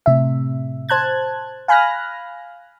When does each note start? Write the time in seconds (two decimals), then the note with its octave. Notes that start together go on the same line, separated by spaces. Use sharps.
0.06 A2 C3 E5
0.89 C5 A5 F#6 G#6
1.68 F5 G#5 B5 F6 F#6 A#6